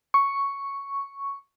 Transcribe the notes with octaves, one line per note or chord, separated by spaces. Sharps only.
C#6